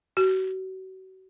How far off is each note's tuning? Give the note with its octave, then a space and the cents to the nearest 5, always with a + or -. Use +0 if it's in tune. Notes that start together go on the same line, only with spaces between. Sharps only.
F#4 +35